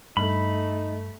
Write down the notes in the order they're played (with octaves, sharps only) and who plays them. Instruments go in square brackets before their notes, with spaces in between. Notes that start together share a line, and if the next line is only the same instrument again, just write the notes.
[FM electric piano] G2 [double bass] A3 [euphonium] D#4 [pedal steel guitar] B5